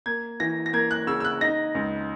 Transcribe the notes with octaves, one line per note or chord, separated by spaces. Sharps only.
A#3 G#6
E3 A#6
A#6
A#3 G#6
F#6
C#3 E6
E6
F#6
D#4 A#6
C#2